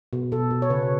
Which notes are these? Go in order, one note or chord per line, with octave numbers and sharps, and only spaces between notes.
B2
B2 A4
B2
C#5
C#3 B4